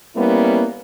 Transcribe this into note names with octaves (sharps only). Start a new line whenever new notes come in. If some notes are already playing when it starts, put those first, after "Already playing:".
G3 A#3 B3 C#4 E4